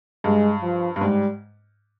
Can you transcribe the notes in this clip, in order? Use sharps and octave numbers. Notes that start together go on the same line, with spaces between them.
G2 G#3
F3
G2
G#2 G3